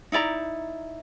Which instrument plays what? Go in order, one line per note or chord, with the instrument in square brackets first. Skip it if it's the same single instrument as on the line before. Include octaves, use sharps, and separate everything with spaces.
[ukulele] D#4 E4 D5 A#5